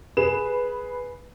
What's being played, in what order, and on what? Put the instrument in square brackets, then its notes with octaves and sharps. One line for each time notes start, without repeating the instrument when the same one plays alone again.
[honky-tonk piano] G#4 B4 E7